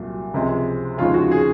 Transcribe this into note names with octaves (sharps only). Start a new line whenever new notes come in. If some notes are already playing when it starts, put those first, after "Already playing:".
Already playing: C2 A#2 F#3
C#2 C3 F3 G#3
D#2 C#3 F3 G#3 F4
F#4
G#4